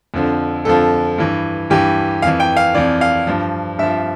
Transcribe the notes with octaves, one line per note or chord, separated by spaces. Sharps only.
F2 D3 F3
F2 D3 F3 A4
G2 E3
G2 E3 G4
F2 E3 F5
G5
F5
F2 E3 D5
F5
G2 F3
G2 F3 E5